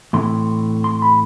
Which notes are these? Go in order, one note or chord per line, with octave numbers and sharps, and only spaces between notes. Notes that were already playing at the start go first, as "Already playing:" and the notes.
A2 E3 A3 C4 C6
C6
B5